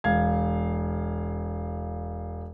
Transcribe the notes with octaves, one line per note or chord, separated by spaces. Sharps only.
E1 F5 G#6